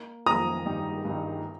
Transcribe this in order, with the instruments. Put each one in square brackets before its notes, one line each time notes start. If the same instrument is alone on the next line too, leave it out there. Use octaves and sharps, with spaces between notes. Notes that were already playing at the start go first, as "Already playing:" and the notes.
Already playing: [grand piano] A#3
[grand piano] F2 D#3 A#3 [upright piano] A#5 D#6
[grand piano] G2 D#3 G3 D#4
G2 D#3 G3 D#4